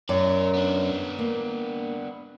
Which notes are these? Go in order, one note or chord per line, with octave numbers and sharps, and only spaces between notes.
F#2 A#4 D5
B3 D4
A#3